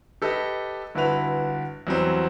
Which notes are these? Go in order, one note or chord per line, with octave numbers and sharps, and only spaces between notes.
G4 A4 B4 D#5
G1 E4 F#4 B4 F7
E2 F#3 G3 C4